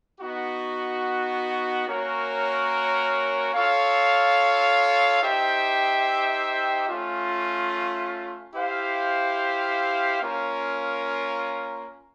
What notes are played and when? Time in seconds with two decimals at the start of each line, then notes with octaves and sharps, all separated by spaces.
0.20 B3 D#4 F#4
1.87 A#3 C#4 F#4 A#4 C#5
3.54 F4 A4 C#5 F5
5.21 D#4 G4 C5 E5 G5
6.88 A3 C#4 F4
8.54 E4 G4 C5 F5
10.21 A#3 C#4 F4 A#4